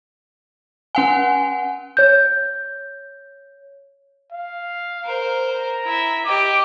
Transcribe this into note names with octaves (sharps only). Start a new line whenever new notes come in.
C#4 F#5 G#5
C#5 G6
F5
A#4 C5
A#5
E4 E5
G4 D#5 D6